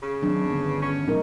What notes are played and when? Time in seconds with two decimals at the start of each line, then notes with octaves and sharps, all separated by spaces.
0.02 C#3
0.22 D#3 F#3 G#3 C4 D4
0.50 G1 G2 D3 B3
0.82 C#4
1.07 A1 B2 F#3 A3 D#4 A#4